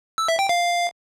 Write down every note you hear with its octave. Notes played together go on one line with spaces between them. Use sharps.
E6
E5
G5
F5